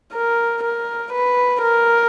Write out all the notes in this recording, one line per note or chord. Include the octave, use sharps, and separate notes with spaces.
A#4
A#4
B4
A#4